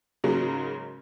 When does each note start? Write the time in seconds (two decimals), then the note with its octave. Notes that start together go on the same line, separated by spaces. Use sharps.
0.24 G#2 C#3 F#3 A#3